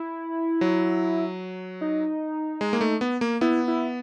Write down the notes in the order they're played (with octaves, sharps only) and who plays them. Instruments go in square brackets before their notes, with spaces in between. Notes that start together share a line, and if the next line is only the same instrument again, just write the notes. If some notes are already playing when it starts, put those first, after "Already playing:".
Already playing: [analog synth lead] E4
[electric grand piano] F#3
[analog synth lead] D#4
[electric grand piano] G#3
A#3
A3
B3
A#3
[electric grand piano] B3 [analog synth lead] E4
[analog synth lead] E4